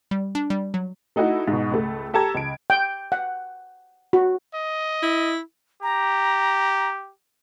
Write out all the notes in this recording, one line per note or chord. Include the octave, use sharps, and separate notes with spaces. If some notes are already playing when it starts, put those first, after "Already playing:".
G3
D4
G3
F#3
A3 D#4 E4 F#4
G#2 B2
C#2 A3
G4 A4 A5 A#5 G#6
C#2 D7
G5
F#5
F#4
D#5
E4
G4 A#5